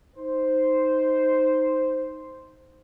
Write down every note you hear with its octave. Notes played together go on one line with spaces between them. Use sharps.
D#4 C5